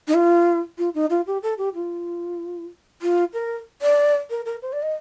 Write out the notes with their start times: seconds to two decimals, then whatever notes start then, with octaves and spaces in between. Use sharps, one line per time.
0.08 D#4
0.14 F4
0.78 F4
0.95 D#4
1.10 F4
1.27 G4
1.43 A4
1.58 G4
1.75 F4
3.02 F4
3.33 A#4
3.82 D5
4.30 A#4
4.45 A#4
4.62 C5
4.73 D5
4.82 D#5